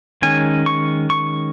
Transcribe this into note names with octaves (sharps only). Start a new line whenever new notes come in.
D#3 G#3 C#4 G#5
C#6
C#6